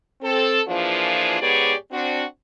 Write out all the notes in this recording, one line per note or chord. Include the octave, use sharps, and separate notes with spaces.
C4 A4
E3 F3 A#3 D4 F4 G#4
G#2 B3 G4 G#4 C#5 D5
C4 D4 F#4